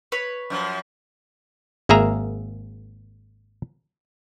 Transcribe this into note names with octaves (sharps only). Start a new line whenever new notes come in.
B4 C#5
F#2 F3
G#1 A#3 G#4 E5 A#5